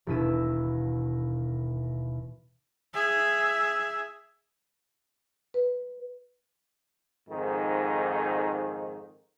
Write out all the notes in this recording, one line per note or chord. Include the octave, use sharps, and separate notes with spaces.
E1 D#2 B2 E4 E6 D#7
G#4 E5
B4
F2 G#2 D#3